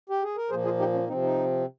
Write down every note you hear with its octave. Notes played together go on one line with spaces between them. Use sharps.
G4
G#4
A#4
A#2 F3 A#3 G#4 C5
F4 G#4
D#4 G4
C#4
C3 F3 C4 D#4
D#4